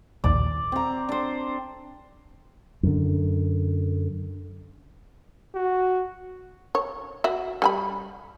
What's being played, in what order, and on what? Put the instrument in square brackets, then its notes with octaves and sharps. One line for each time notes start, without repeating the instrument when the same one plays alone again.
[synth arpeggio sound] A#1 D#2 [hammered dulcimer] D5
[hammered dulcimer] C4 A#5
D4 C5
[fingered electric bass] F#2 D3
[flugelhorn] F#4
[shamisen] C#5
F#4 E5
G3 G#5 B5